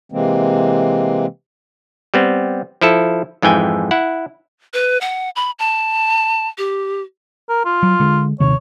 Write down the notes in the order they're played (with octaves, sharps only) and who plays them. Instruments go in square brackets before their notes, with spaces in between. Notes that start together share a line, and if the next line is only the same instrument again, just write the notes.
[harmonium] C3 E3 G#3 A#3 C4
[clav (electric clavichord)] G3 B3 C4
F3 E4 A4
F2 G#2 E3 G5 G#5
E4 F#5
[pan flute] B4
F#5
B5
A5
G4
[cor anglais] A#4
F4
[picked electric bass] F#3
D3 G#3
[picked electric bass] D#1 C3 D#3 [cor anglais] C#5